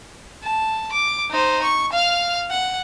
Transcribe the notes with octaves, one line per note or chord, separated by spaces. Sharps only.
A5
D6
D#4 C5
C#6
F5 F6
F#5